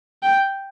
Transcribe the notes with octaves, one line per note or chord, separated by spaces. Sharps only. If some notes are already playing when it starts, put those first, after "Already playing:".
G5